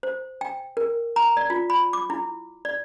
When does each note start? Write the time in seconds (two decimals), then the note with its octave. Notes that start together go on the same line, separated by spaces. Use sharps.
0.03 C5
0.41 G5
0.77 A#4
1.16 A#5
1.37 D5
1.50 F4
1.70 B5
1.93 D6
2.10 E4
2.65 D5